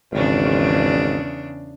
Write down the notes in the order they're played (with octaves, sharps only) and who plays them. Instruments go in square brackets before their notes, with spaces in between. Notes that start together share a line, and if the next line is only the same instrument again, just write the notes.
[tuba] G#1 [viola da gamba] E2 C#3 D4